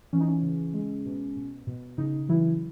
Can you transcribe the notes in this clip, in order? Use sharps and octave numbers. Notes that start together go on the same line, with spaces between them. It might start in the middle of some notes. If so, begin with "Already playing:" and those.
E3 C#4
D#4
C#4
C#3
G#3
B2
B2
B2
C#3 D#4
E3 F#3 E4